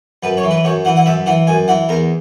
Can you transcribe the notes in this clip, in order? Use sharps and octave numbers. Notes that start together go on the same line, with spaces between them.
F#2 B4
C#5
E3
B4
F#2 C#5
E3 F#5
F#5
F#2 E5
E3 F#5
F#2 G#5
E3 F#5
E2 A#4